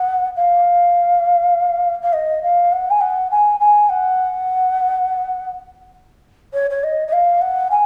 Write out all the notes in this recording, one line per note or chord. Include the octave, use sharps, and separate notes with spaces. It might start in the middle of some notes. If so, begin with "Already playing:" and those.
Already playing: F#5
F5
F5
D#5
F5
F#5
G#5
F#5
G#5
G#5
F#5
C#5
C#5
D#5
D#5
F5
F#5
G#5